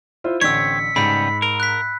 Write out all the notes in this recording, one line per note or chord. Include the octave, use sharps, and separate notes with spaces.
E4 F4 C5
A1 D3 C4 C#5 E6 B6 C#7
G#2 C#3 G3 B3 B5
A#4
F#6 B6